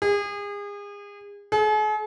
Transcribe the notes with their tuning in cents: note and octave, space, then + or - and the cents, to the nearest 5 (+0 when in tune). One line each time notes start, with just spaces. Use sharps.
G#4 -35
G#4 +45